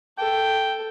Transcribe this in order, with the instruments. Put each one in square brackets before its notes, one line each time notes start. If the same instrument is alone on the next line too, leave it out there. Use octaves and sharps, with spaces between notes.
[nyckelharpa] A4 [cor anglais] G5